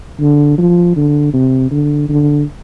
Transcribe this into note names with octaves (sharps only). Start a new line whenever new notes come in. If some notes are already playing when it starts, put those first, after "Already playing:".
D3
F3
D3
C3
D3
D3